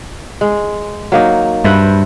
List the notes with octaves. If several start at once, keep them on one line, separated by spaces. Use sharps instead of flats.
G#3
F#3 A#3 D#4
G2 B4 C5 E5